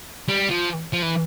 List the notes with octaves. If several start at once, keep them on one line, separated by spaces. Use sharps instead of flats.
G3
F3
F3
E3